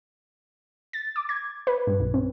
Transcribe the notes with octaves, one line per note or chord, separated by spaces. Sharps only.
A6
D6
G#6
B4
G2
B1
C4